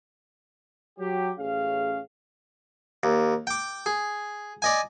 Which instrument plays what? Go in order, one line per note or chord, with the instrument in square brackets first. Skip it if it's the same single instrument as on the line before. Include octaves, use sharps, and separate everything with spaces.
[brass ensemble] F#3 G4
A1 C#4 G#4 F5
[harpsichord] D#2
G5 D6
G#4
D5 D#5 G#5